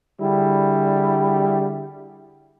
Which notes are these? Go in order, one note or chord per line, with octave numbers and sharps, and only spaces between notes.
D3 G3 D4 E4 F#4 G#4